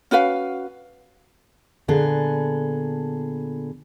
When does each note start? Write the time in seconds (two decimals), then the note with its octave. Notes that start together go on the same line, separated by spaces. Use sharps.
0.11 C#4 F#4 B4 F5
1.88 A#2 D3 B3 G#4 A4